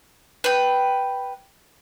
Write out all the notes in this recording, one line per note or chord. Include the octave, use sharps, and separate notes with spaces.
B4 G5